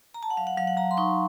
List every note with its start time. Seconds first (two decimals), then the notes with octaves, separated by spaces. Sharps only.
0.14 A#5
0.23 A5
0.30 F#5
0.37 F#3 F5
0.47 F#5
0.58 F#3 F5
0.67 F#5
0.77 F#3 A#5
0.91 C6
0.97 D#4 C#6